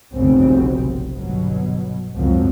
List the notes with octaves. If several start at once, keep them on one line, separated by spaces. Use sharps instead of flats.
F1 B1 G2 C#3 F#3 C4
G1 B2 F#3
G#1 C#2 F#2 F3 F#3 C4